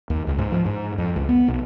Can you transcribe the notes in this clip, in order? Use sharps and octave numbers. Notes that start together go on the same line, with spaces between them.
D#2
C#2
G#2
F3
G#2
F2
C#2
B3
B1